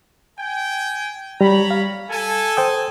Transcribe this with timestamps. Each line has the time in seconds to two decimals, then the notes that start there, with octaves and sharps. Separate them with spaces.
0.39 G5 G#5
1.41 G3 C#5 A#5 B5
1.71 F5
2.10 A4 G#5
2.57 C5 G5 D#6